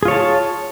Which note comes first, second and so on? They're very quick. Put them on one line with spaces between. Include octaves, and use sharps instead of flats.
G#4 F4 C#5 A5